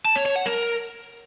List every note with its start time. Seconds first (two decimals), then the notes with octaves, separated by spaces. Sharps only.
0.05 A5
0.16 C#5
0.26 C#5
0.36 F#5
0.46 A#4